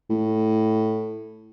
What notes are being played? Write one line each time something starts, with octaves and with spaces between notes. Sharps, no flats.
A2